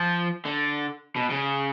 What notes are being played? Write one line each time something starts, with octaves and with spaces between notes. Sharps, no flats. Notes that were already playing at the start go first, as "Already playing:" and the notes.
Already playing: F3
D3
B2
C#3